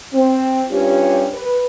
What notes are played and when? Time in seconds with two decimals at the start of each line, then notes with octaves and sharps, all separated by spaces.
0.12 C4
0.68 G2 C#4 F4 G4
1.33 B4